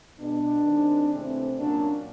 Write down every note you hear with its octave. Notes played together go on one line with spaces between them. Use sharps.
B2 G#3 B3 D4
D#3 G#3 C4
C3 E3 A3 C4
A#2 F#3 A#3 C#4 D4